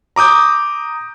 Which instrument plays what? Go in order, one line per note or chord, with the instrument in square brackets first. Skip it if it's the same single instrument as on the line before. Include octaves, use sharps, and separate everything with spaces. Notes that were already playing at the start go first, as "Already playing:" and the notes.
[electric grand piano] A#5 D6 D#6 G6